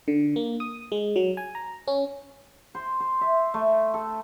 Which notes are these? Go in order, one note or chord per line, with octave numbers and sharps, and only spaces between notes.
D3
A#3
D#6
G#3
F#3
G#5
A#5
C#4
C5
C5
E5
A3
A4